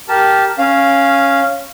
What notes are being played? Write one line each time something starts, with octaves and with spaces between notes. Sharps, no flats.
G4 A#4 A5
C#4 F5